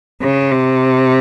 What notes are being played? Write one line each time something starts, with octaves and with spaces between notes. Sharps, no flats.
C#3
C3